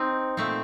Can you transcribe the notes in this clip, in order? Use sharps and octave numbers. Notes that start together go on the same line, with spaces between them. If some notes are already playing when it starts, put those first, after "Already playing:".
Already playing: C4 D#4
A#2 A3 C4